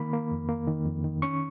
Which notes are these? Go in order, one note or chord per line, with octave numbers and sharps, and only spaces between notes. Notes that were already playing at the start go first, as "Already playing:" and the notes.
Already playing: D#3 A#3 B5
A#3
F2
A#3
D#3
F2
D#3
C#4 C#6